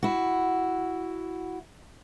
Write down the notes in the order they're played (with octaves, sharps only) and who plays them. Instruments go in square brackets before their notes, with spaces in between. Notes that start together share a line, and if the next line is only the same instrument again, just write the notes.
[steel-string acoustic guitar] E4 F#4